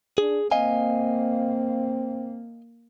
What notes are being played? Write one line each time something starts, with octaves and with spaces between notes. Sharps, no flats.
D4 G#4
A#3 C4 D#5 F5 G#5